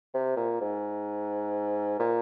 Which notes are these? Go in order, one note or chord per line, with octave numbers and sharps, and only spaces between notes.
C3
A#2
G#2
A#2